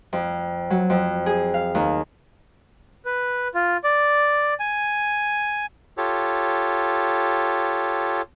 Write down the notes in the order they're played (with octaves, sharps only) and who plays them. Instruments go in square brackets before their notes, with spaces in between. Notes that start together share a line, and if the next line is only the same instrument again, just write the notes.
[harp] F2
F#3
F2
G#4
F5
D#2
[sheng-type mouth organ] B4
F4
D5
G#5
[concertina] F4 G4 A4 C#5